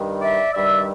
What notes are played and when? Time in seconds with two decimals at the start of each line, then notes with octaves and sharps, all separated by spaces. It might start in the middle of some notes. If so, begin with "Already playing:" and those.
Already playing: G2 D#3 G3
0.21 D5 E5
0.54 G2 D#3 G3 D5 E5